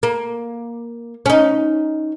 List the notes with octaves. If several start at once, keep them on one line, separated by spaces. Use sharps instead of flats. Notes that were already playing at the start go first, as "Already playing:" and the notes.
A#3
C#4 D#4